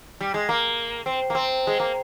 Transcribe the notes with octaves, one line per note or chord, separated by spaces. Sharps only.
G3
G#3
A#3
C4
A#3
C4
G#3
A#3